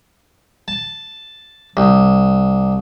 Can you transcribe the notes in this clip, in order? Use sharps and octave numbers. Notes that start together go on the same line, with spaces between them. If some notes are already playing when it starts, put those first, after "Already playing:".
A5
C2